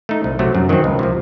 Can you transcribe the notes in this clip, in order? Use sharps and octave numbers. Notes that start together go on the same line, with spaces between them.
A3 D#4
C2
C3 F#3 A3
F#2
D#3 F#3 C4
C#2
C3 F3